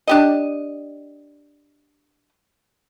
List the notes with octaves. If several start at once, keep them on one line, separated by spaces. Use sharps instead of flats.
D4 G4 D#5